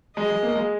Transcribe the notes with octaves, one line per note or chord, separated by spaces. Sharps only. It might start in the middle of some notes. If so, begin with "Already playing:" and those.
G#3 D#5
G#3
A#3
G#3